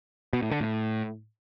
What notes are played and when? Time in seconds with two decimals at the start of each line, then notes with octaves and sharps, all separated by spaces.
0.33 B2
0.42 A2
0.51 D3
0.61 A2